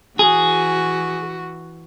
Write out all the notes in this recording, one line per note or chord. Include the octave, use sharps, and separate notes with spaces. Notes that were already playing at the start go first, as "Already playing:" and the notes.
E3 F#4 G#4